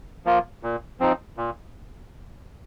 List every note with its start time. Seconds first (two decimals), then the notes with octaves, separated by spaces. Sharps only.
0.25 F3 A#3 F4
0.63 A#2
0.99 F3 C4 D#4
1.37 A#2